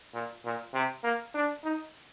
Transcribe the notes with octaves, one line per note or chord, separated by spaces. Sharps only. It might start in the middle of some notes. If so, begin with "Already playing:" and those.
A#2
A#2
C3
A#3
D4
D#4